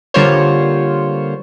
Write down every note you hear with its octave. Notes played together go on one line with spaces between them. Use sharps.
D3 G3 A#3 F4 C5 C#5